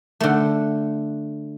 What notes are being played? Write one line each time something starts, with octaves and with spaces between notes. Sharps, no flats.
D3 A3